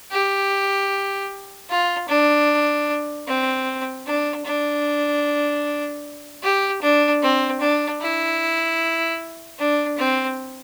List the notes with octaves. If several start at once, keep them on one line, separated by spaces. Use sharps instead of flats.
G4
F4
D4
C4
D4
D4
G4
D4
C4
D4
E4
D4
C4